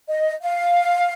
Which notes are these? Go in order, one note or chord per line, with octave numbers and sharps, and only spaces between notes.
D#5
F5